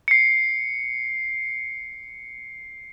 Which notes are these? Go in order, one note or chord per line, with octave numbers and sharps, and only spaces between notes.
C7 C#7